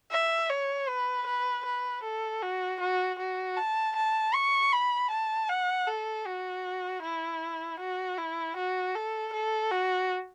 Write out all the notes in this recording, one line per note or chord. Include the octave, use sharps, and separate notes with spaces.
E5
C#5
B4
B4
B4
A4
F#4
F#4
F#4
A5
A5
C#6
B5
A5
F#5
A4
F#4
E4
F#4
E4
F#4
A4
A4
F#4